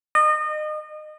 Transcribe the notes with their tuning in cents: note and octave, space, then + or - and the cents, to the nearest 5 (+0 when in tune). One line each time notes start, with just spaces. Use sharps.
D#5 -30